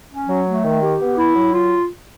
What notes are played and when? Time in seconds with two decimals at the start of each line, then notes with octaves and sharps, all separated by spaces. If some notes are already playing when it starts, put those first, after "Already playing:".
0.10 C#4
0.28 F#3
0.47 A3
0.64 D#3
0.82 G4
1.00 B3
1.17 E4
1.35 F#3
1.54 F4